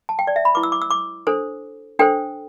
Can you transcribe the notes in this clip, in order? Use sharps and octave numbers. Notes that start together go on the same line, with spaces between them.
A5
G5
D5
E5
B5
E4 B4 D6
E6
D6
E6
D6
D4 A4 C5
D4 A4 C5 G5